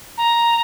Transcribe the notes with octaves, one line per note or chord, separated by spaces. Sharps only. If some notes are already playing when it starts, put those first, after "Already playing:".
A#5